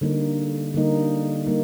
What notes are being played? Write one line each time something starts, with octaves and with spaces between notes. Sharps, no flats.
D3 G3 A#3 D#4
D3 G3 A#3 D#4
G3 A#3 D#4